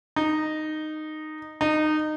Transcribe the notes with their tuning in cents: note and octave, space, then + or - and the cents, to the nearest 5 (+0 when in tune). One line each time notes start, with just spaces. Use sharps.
D#4 -10
D#4 -20